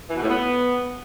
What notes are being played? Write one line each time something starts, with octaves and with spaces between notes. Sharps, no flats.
E3
B2
A2
B3